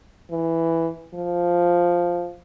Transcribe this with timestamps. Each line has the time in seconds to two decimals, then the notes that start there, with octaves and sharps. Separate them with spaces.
0.31 E3
1.14 F3